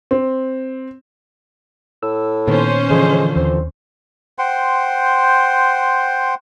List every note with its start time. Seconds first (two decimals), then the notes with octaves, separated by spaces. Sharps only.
0.11 C4
2.03 A2 E6
2.48 A#2 D#3 B3 C#4 C5
2.90 D3 E3 F3 G#3
3.36 D#2 C4
4.39 C5 F#5 G5 C6